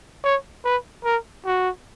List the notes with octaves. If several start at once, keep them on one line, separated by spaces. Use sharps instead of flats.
C#5
B4
A#4
F#4